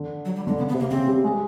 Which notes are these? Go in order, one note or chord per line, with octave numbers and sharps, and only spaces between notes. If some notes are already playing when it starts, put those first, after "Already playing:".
Already playing: D3
F#3
G3
D3 G#3
C#3 B3
B3
C3
A#3
C#3 C4
G3
G#3